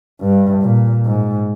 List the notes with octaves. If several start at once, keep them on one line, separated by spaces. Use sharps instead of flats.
G2
A#2
G#2